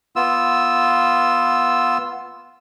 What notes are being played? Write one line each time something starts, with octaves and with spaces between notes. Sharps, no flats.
B3 F4 E6